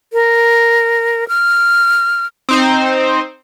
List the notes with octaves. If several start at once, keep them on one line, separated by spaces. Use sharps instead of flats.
A#4
F6
C4 D#4 C5